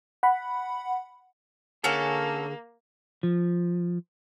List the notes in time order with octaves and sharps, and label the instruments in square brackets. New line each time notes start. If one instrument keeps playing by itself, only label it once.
[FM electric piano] F#5 B5
[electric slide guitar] D3 G#4 [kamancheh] A#3 [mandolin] C#4 F#4 A4
[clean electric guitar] F3